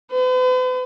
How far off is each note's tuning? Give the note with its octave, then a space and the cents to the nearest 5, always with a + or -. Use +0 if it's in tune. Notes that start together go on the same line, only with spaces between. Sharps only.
B4 +45